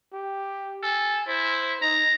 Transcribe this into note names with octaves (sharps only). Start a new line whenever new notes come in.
G4
A4 G#5
E4 C5
D#4 A#5